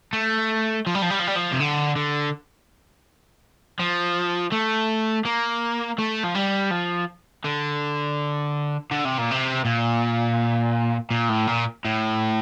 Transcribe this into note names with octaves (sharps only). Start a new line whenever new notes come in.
A3
F3
G3
F3
G3
F3
G3
F3
C3
D3
D3
F3
A3
A#3
A3
F3
G3
F3
D3
D3
C3
A#2
C3
A#2
A#2
A2
A#2
A2